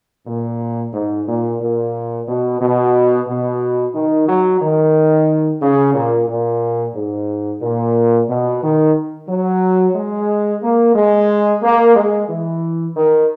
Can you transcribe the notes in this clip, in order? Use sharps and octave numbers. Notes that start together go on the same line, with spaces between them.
A#2
G#2
A#2
A#2
B2
B2
B2
D#3
F#3
D#3
C#3
A#2
A#2
G#2
A#2
B2
D#3
F#3
G#3
A#3
G#3
A#3
G#3
E3
D#3